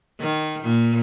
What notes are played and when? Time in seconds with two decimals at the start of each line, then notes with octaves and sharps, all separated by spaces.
0.20 D#3
0.62 A#2